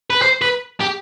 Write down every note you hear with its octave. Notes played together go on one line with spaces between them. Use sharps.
B4
C5
B4
G4